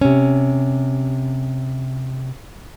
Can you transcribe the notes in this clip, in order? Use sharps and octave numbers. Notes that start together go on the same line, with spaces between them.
C3 C#4